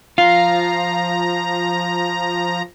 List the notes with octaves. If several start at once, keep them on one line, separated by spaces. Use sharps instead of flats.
F3 F4 F5 A#5